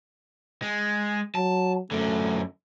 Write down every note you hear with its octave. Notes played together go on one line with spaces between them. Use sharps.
G#3
F#3 A5
F#2 D3 A3